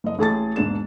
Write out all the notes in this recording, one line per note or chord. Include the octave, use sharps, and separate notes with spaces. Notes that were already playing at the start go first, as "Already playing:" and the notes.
F#1 D#5
A1 G#4 A5 A6
E1 G#2 D4 E7